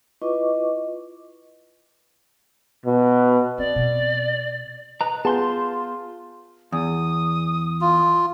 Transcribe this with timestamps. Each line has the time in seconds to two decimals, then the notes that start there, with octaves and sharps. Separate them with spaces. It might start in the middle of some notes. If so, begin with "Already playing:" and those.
0.22 E4 F4 B4 D#5 C#6 D6
2.86 B2
3.58 C4 D5
3.76 B2 C4
5.01 B4 D#5 A#5
5.25 B3 F4 G#4 A5 C6 G6
6.72 E2 D#6
7.81 F4